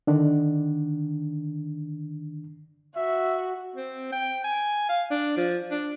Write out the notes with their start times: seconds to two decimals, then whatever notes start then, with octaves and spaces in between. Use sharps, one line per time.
0.07 D3 D#3 D4
2.96 F#4 E5
3.76 C4
4.12 G5
4.44 G#5
4.89 F5
5.11 D4
5.37 F3
5.71 D4